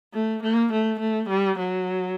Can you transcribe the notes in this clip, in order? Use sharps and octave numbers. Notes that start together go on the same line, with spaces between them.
A3
A#3
A3
A3
G3
F#3